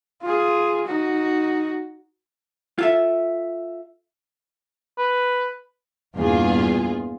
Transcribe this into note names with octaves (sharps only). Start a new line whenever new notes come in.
F4 G#4
D#4 F#4
F4 A4 E5
B4
E2 G2 A#2 F4 G#4